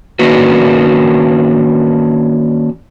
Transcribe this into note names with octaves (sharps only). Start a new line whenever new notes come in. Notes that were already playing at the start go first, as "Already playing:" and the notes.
D#3 A#3 C#4 D4 F#4 B4